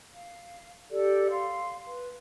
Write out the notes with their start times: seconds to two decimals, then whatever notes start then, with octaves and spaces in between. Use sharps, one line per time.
0.11 F5
0.91 G4 A4 D5
1.29 F5 C6
1.85 B4